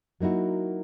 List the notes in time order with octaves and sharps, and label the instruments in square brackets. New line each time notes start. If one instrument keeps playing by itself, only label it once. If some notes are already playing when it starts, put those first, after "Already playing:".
[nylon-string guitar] F#3 A#3 D#4 E4 F#4